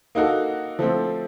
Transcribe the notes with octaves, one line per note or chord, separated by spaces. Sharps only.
A#3 D#4 F#4 A4
F3 A3 C4